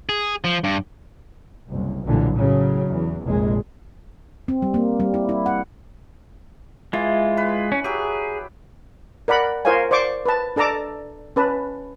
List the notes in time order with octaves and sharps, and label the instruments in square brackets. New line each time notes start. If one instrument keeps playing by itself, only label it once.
[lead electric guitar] G#4
F3
G2
[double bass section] F#1 C2
B1 G2 A#2 D3 E3
A2 C#3 F#3
E2
F1 A#1 G#3
[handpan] C4
G3
A#3
G3
E4
E4
F#5
[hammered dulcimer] E3 [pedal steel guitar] G#3 F4
[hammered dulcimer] B4
[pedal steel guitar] C#4
[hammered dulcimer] F#3 G4 [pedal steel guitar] G#4
[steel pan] A#4 D5 F#5 B5
F4 A#4 C5 C#5 F5 G#5
C5 D5 C#6 D6
B4 A5
D4 A4 A5 A#5 D6
C#4 B4 A5